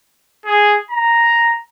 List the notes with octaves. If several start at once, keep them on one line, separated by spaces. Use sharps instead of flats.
G#4
A#5